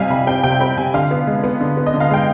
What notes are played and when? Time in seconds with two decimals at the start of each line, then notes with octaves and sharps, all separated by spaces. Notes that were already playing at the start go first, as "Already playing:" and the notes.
Already playing: C3 G3 D#5 F5 G#5
0.10 C3 B5
0.27 C4 G5
0.43 C3 G5
0.60 C4 B5
0.77 C3 G#5
0.94 D3 F5
1.11 B3
1.27 G#3
1.44 B3
1.60 D3
1.77 B3
1.86 D#5
1.94 D3
2.00 F5
2.10 G#3 G5